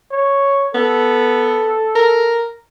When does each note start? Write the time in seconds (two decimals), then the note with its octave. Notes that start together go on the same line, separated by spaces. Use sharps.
0.12 C#5
0.75 B3 A4
1.96 A#4